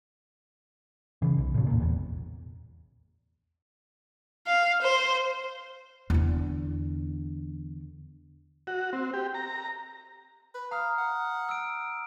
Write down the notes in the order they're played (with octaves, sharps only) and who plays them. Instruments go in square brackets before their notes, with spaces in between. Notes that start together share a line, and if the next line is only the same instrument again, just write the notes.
[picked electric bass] C#3 E3
B1
A2 C#3
E1 A#2
E1 A#1 E2
[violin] F5
C5
[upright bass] E2 D3
[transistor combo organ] F#4
C4
G4
A#5
[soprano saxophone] B4
[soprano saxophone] F5 [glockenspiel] A#5 D#6 F6
[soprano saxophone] F#5
[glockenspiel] E6 D7